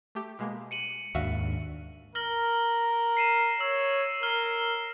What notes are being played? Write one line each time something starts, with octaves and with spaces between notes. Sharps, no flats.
A3 G4
B2 G#3 A#3
C#7 D#7 F#7
D#2 G#2 D4 F#4 E5 F5
A#4 F6 A#6 F#7
C7 D#7 E7
C#5 E6
A#4 F6 C7